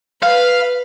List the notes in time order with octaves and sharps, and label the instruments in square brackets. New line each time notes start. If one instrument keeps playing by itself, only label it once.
[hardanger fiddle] B4 [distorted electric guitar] F5